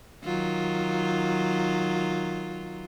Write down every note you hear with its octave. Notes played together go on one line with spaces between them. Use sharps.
D#3 F#3 F4